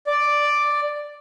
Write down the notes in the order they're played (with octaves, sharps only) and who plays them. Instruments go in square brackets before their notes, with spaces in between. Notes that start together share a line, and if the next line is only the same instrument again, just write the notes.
[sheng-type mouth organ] D5